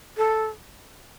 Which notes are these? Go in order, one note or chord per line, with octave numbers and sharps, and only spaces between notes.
A4